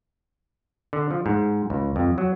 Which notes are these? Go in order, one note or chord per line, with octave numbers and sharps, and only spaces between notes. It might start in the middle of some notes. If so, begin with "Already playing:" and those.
D3
F3
G#2
C#2
F2
F#3